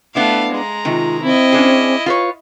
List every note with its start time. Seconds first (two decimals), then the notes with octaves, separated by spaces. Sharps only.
0.15 A3 B3 D4 E4 F5
0.51 G#3 A#5
0.85 C3 D#3 F4
1.23 C4 E4 D#5
1.53 C#4 D4 G#4
2.06 F4 B4 C#5